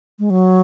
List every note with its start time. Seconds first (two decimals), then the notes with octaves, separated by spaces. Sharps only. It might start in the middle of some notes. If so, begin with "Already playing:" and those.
0.19 G#3
0.30 F#3